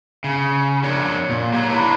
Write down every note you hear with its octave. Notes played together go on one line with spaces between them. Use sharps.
C#3
F2 F#3 D4 A#4 C#5
A#2
F#3 G4 C#5 A#5
E2 A#3 D4 E4 B4 A#5